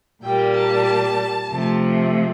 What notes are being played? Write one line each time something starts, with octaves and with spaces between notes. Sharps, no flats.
A#2 G3 A#3 G5
A5
C3 F3 A3